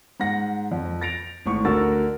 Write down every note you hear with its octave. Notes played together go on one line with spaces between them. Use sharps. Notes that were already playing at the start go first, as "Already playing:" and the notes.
G#2 F#5 A#6
F2
A6 A#6 D7 F7
G#1 A2 C#6
D2 D3 F#4 A#4 E6 A6